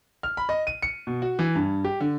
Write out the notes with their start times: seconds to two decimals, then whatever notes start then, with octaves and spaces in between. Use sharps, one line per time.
0.23 F6
0.37 B5
0.49 D#5
0.67 D#7
0.82 C#7
1.07 B2
1.22 F#4
1.39 E3
1.55 G2
1.84 G4
2.00 D3